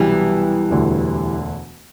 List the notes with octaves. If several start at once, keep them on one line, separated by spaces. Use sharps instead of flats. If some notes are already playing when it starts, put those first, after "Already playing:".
Already playing: C2 B2 E3 F#3 G3
E1 D2 D3 A3